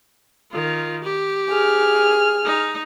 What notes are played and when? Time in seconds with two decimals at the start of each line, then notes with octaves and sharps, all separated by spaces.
0.52 D#3 F4
1.04 G4
1.50 G#4 F6
2.45 D#4